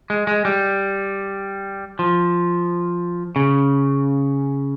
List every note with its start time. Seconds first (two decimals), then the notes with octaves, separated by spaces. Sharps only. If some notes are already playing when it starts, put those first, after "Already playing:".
0.10 G#3
0.27 G#3
0.45 G3
1.99 F3
3.36 C#3